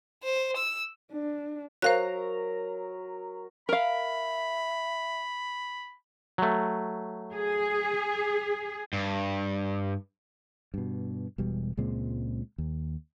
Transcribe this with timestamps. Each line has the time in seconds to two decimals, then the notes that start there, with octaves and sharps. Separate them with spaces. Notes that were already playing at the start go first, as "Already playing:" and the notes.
0.24 C5
0.57 E6
1.12 D4
1.82 F#3 A#4 C5 F5 A#5 F#6
3.69 A#4 E5 F5 B5
6.38 F#3 A3
7.34 G#4
8.93 G2
10.74 G2 B2
11.38 E1 B2 G3
11.77 C#2 A#2 G#3 C4
12.58 D#2